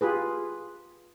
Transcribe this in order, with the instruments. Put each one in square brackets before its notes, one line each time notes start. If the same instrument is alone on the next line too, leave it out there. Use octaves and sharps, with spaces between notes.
[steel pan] F4 G4 G#4 B4